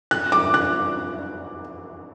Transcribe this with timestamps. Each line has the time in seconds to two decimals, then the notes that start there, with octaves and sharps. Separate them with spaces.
0.11 F#6
0.32 D6
0.54 F#6